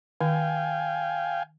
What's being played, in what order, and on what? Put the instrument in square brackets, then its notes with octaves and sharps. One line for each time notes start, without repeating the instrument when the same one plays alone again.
[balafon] D#3 [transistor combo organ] F5 G5 G#5